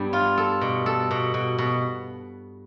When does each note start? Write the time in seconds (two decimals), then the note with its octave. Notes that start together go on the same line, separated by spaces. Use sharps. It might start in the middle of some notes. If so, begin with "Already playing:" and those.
Already playing: G2 G3 B3
0.13 F4
0.37 A4
0.61 B2
0.86 A4
1.11 B2
1.34 B2
1.58 B2